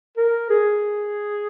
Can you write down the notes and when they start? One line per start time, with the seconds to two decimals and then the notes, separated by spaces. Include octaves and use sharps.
0.17 A#4
0.50 G#4